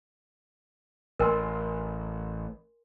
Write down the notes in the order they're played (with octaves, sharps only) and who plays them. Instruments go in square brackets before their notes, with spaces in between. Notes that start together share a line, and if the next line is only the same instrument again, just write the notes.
[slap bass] A1 [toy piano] A#4 G#5 C6